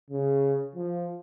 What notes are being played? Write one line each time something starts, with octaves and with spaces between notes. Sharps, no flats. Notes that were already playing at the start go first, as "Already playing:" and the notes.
C#3
F3